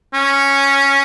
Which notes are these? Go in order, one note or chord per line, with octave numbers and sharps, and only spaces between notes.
C#4